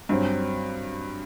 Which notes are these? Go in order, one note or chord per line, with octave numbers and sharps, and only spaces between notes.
G2 F#3 C4